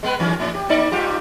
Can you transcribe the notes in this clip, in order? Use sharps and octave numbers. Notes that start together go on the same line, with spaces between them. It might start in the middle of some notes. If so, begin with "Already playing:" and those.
G#3 B3 B4
D#2 E3 C#4
A2 C#4
G4
A#3 D#4 D5
G#2 F4 G4